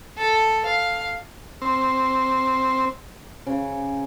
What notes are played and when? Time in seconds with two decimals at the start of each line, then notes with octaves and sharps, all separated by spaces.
0.18 A4
0.66 F5
1.62 C4
3.47 C#3